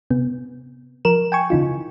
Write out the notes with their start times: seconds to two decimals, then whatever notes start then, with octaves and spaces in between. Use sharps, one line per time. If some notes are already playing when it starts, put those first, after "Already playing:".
0.11 C3 B3
1.05 F3 A#4 E7
1.32 G5 G#5 C#6
1.50 C#3 E3 D#4 F4